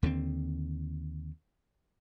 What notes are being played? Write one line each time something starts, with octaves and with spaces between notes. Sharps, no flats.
D#2 D3 D#3 C4